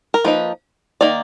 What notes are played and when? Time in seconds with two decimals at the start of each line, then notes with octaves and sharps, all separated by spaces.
0.14 A#4
0.24 F3 A#3 D#4 B4
1.01 D#3 A#3 D#4 D5